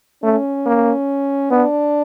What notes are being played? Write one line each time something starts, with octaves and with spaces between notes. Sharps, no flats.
A3 C#4
A#3
B3 D4